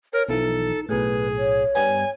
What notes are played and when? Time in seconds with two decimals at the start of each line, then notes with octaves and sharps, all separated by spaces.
0.13 A#4 C#5
0.28 B1 E3 F3 D#4 A4
0.89 B1 A2 G#4 B4
1.37 C#5
1.75 G2 G3 B3 G#5